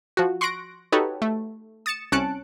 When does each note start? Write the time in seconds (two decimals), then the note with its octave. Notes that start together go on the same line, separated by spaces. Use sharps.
0.17 F3 F#4
0.41 C6 C#6 F#6 A#6 D7
0.92 D#4 F#4 G4 A4 B4 C#5
1.22 A3
1.86 D#6 A6 C#7 E7
2.12 C2 C#4 A5 F#6 C#7 D7